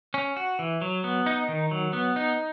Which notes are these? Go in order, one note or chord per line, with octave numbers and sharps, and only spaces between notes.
C#4
F#4
E3
F#3
B3
D#4
D#3
F#3
B3
D#4